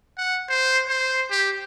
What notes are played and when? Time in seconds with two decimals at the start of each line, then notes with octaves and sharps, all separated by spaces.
0.17 F#5
0.50 C5
0.88 C5
1.30 G4